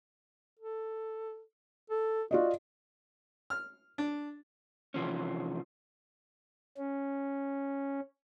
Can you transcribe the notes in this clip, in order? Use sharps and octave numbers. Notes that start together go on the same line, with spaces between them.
A4
A4
F4 F#4 D5 D#5
F6
D4
C3 E3 F3 C#4
C#4